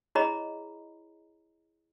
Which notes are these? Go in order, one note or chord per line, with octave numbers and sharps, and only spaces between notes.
E4 G#4 C#5 D#5 A#5 B5